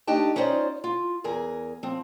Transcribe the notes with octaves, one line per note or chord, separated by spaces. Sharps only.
A3 D4 D#4 G4 G5 A5
C#4 D#4 F4 C5 D5 D#5
F4
E2 G#4 A#4 G#5
F3 C4